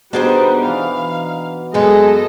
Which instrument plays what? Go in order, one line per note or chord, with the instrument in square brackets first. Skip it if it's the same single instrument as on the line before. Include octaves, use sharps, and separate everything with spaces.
[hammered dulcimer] B2 D#4 [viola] G3 B3 [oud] D4 G#4 C5
[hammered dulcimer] E3 [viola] F5
[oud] F#2 B3 [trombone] G#3 [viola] A4 D#5